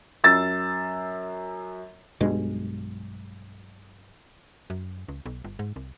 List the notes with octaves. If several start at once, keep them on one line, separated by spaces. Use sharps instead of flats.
F#2 E6 A6
B1 G2 B2 G#3
F#2
C#2
B1
G1
G#2
C2